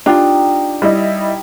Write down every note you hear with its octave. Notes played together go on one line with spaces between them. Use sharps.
D4 D#4 F4 G4 A#5
G3 E4 D#5